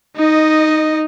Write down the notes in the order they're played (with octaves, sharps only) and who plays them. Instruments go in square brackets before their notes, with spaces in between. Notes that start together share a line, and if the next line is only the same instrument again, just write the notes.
[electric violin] D#4 D#5